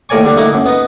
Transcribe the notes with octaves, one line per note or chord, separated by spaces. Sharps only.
D#2 A2 A#4 D5 G#5 C#6
D3 G3 D4
A3 A#3 D#4 E4 F#5
F#2
B3 D#4